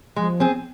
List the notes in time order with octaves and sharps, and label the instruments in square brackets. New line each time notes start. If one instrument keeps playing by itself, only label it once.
[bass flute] F3 [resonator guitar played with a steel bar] G#3
[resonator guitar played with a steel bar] C4 G#4